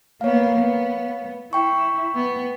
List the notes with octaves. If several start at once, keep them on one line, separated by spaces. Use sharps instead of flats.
A#3 B3 C#5 F5
B3
E4 G5 C#6
B3